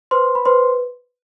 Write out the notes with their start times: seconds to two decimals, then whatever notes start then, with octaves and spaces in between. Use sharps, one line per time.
0.11 B4 C5 C6
0.35 B5
0.45 B4 C5 C6